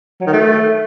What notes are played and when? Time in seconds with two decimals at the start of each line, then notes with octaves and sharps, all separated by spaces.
0.20 F#3
0.27 D#3
0.33 A3